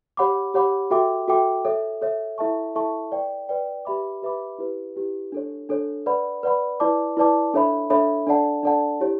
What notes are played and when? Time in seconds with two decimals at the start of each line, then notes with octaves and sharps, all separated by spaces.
0.17 G4 C#5 F#5 B5 D6
0.54 G4 C#5 F#5 B5 D6
0.91 F#4 A4 E5 G5 D6
1.28 F#4 A4 E5 G5 D6
1.65 A4 C#5 E5
2.01 A4 C#5 E5
2.38 E4 A4 E5 A5 C#6
2.75 E4 A4 E5 A5 C#6
3.12 B4 D5 G5
3.49 B4 D5 G5
3.85 G4 B4 E5 B5 D6
4.22 G4 B4 E5 B5 D6
4.58 E4 G4 B4
4.96 E4 G4 B4
5.32 D4 A4 C#5
5.69 D4 A4 C#5
6.06 B4 D5 F#5 B5
6.43 B4 D5 F#5 B5
6.80 E4 B4 D5 A5 D6
7.17 E4 B4 D5 A5 D6
7.54 D4 A4 C#5 E5 B5
7.90 D4 A4 C#5 E5 B5
8.27 D4 A4 D5 F#5 A5
8.63 D4 A4 D5 F#5 A5
9.00 E4 G4 C#5